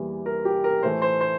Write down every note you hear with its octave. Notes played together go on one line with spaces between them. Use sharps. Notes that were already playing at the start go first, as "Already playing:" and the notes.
Already playing: E2 E3 G3 A#3
A#4
G4
A#4
A2 E3 A3 C5
C5
C5